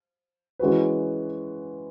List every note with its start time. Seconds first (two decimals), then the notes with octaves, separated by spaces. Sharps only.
0.59 E3 G#3 C#4 F#4 B4